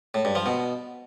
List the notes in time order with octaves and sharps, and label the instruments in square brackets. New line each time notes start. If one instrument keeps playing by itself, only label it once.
[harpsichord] A2
G2
F3
B2